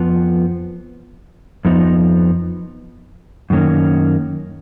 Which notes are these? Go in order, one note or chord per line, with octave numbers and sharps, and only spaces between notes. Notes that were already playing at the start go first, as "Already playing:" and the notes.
Already playing: F2 F3 B3
F2 F3 B3 D#4
F#2 D#3 A#3 C#4